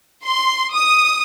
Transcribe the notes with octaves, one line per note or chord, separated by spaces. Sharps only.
C6
D#6